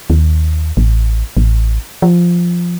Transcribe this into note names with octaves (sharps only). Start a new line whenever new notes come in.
D#2
A1
A1
F3